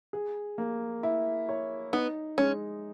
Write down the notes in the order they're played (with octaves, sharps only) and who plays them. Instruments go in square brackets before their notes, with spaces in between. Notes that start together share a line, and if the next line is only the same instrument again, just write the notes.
[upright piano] G#4
A#3
E4
C#5
[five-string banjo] B3 [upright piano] D#4
[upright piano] G#3 [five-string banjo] C#4